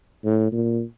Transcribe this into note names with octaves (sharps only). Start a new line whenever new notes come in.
A2
A#2